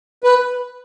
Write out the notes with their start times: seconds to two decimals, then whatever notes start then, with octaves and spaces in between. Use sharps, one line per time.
0.24 B4